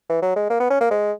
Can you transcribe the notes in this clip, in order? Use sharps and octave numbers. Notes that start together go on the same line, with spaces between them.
E3
F#3
G#3
A#3
B3
C#4
A#3
G#3